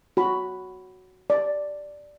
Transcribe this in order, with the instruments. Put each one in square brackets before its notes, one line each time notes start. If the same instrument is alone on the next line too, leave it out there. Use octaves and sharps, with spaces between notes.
[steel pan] F#4 B5
D5